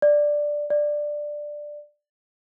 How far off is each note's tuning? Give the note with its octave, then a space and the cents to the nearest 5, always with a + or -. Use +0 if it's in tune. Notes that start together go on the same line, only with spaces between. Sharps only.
D5 +5
D5 +10